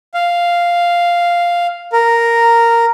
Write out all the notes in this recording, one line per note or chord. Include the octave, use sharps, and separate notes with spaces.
F5
A#4